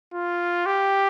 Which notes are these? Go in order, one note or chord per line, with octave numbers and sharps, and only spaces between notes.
F4
G4